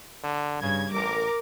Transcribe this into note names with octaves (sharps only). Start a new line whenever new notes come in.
D3
G2 C#3 G#6
A1 A#4 D6